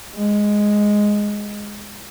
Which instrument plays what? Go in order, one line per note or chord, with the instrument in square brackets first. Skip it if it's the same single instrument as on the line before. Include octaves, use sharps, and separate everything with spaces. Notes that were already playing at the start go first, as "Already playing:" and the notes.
[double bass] G#3